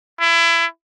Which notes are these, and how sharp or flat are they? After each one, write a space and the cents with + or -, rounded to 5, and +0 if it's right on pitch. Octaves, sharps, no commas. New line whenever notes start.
E4 +25